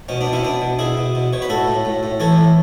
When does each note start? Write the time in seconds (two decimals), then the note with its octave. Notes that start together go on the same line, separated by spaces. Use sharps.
0.09 B2 C#4
0.21 B3 D4
0.27 B2
0.33 C#4 E4
0.44 B2 B3 D4
0.61 B2
0.79 B2 E4 G#4
0.97 B2
1.15 B2
1.33 B2 C#5
1.42 B4
1.49 A2 F#4 A4
1.68 A2
1.85 A2
2.03 A2
2.20 E3 A4 C#5
2.37 A2